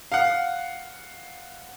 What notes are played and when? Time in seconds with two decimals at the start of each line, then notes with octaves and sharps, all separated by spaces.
0.12 F5 F#5